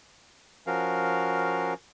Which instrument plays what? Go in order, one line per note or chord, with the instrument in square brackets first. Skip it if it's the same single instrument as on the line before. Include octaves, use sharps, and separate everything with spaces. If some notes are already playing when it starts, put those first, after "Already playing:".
[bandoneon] F3 C#4 F#4 A#4 F5